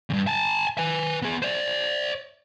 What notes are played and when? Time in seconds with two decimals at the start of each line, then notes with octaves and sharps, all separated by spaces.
0.10 E2 G2
0.27 G#5 A5
0.78 B4 G#5
1.22 B3 G#4
1.42 C5 D5